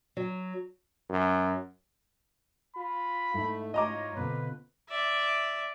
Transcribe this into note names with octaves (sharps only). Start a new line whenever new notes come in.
F#3
F#2
F4 B5
G#2 A3 E4
F4 C#5 D#5 A#5 D6
B2 D3 C4 B4
D5 E5